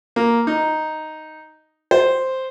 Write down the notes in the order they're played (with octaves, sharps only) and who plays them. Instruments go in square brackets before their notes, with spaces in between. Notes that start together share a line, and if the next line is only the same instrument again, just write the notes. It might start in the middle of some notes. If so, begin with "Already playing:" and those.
[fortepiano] A#3
D#4
C5